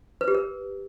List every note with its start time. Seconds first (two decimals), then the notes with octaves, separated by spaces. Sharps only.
0.21 B4
0.28 G4
0.35 A#4